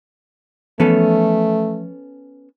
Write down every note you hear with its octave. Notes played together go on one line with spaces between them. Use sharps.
E3 F3 A3 B3 C#4 A4